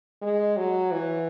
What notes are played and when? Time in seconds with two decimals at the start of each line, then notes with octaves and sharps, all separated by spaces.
0.22 G#3
0.56 F#3
0.91 E3